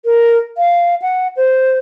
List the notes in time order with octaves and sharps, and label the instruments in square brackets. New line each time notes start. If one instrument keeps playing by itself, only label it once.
[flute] A#4
F5
F#5
C5